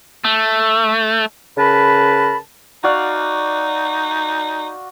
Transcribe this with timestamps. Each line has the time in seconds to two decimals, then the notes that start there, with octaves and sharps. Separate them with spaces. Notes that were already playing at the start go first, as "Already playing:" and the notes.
0.24 A3
1.57 C#3 A#4 B4 A5 B5
2.84 D#4 F#4 D5 F5